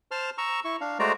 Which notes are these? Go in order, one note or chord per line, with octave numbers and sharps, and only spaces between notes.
C5 A5 C6 F6
A#5 C#6 E6
E4 C#6
D4 F5
G#3 A3 F#4 C5 D5 A#5